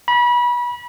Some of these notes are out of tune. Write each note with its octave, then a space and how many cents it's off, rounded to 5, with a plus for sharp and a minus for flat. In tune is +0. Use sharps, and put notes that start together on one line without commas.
B5 -30